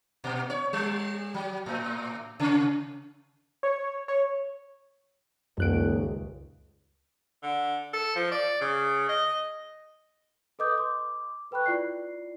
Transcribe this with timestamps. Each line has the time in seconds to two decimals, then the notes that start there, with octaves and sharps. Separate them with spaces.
0.24 A#2
0.50 C#5
0.73 G3
1.34 F#3
1.66 A2
2.40 C3
3.63 C#5
4.08 C#5
5.58 D#1 C#2 F#2 F#6 D7
7.43 D3
7.93 A4
8.16 F3
8.32 D5
8.61 C#3
9.09 D#5
10.59 A4 B4 D#5 D6 D#6 G6
10.78 C6 D6
11.51 A4 B4 G5 B5 C#6 F#6
11.66 E4 F4 D5 C7